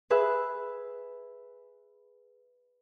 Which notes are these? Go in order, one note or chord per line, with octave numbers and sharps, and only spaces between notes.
G#4 B4 E5